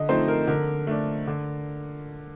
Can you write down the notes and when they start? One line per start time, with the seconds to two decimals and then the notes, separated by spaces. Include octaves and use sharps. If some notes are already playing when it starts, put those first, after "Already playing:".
Already playing: D3 D#5
0.09 F3 A3 C4 D#4 C5
0.28 A#4
0.47 D3 A#4
0.87 A3 D4
1.27 D3